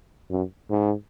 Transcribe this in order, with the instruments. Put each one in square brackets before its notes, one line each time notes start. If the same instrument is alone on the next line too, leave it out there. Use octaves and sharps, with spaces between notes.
[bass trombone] F#2
G#2